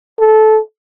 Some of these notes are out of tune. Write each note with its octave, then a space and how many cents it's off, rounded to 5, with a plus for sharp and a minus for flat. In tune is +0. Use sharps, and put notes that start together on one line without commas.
A4 -15